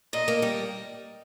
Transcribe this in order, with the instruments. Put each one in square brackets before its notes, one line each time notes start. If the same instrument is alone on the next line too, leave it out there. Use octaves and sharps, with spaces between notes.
[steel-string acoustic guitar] A#2 [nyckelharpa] D#5
[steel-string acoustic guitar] A#3
G3